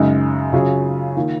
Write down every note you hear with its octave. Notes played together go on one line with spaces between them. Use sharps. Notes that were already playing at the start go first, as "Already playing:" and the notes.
Already playing: F#2 C#3 G#3 D#4
C#3 F#3 C#4 F4 G#4
D#3 A#3 F4